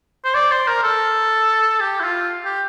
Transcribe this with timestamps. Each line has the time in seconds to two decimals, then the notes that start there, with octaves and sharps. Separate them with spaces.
0.24 C5
0.35 D5
0.52 C5
0.68 A#4
0.84 A4
1.81 G4
2.00 E4
2.05 F4
2.45 G4